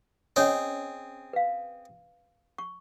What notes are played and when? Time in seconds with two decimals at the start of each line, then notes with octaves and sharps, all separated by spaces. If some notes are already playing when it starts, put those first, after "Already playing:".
0.36 C4 C#4 G#4 C#5 D#5
1.33 B4 F5
2.58 C#6